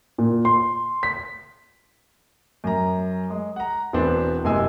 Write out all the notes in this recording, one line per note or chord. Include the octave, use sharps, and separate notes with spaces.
A#2
C6
B6
F#2 A#5
G#3
F#5 A#5
E1 E3 B3 C4 D4
F#1 C3 G#3 G#5 E6